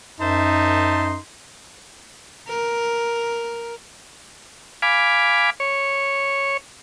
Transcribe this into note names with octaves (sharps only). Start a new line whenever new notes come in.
F#2 D#4 C5 E5 A5 C6
A#4
F5 G#5 B5 D6
C#5